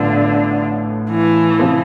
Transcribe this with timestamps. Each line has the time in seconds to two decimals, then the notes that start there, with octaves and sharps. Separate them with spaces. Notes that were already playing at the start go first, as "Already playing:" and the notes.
Already playing: A1 A2 D3 F3 B3 F4
1.10 E3
1.59 C3 F3 C4